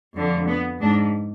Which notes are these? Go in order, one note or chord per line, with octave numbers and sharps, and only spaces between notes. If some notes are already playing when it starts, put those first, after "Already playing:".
F2 D3
B3
G#2 D4